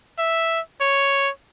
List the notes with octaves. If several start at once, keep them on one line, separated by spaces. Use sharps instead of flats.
E5
C#5